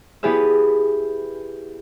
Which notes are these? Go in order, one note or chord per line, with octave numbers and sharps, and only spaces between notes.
B3 E4 G4 G#4 B4 E5